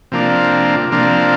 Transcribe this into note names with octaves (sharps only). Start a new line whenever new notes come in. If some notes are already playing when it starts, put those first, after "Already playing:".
C3 F3 A#3 D4
C3 F3 A#3 D4